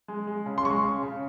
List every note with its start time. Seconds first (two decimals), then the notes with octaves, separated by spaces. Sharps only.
0.08 G#3
0.27 G#3
0.46 C#3
0.58 C6
0.65 G#3 C#6
0.84 C#3
1.03 C#3